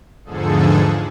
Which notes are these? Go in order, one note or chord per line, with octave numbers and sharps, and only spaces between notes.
E2 G#2 D3 F3 G#4 A4